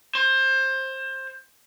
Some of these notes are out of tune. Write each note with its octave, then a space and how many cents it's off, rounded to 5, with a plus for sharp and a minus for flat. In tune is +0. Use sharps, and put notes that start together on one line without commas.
C5 +20